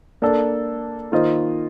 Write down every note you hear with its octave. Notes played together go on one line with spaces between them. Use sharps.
A#3 D4 A4 D5
D#3 A#3 F4 C5 D#5